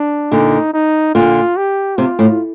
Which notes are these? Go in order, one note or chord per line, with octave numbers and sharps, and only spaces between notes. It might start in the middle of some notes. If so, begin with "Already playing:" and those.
Already playing: D4
A#2 D3 D#4
D#4
A#2 D3 F4
G4
C3 F4
A2